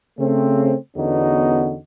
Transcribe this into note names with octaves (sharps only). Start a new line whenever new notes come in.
C#3 A3 C4
E2 D3 B3 C#4 D#4 F#4